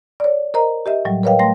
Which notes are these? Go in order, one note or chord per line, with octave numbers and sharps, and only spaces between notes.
C#5 D5
A#4 C5 D#5 A#5
G4 D#5 E5
A2 F#3 G3
A#4 B4 C#5 D#5 F5 G5
A3 G5 C6 A#6